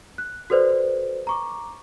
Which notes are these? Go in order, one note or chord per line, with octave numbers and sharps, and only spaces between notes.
F#6
F#4 A4 B4 C5 D5
A#5 C#6 D6